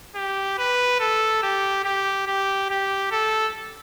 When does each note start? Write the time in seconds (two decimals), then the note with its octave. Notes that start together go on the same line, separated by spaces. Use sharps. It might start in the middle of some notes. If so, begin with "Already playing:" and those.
0.15 G4
0.58 B4
1.00 A4
1.43 G4
1.84 G4
2.27 G4
2.70 G4
3.12 A4